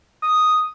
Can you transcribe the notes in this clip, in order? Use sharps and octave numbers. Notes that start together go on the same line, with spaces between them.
D#6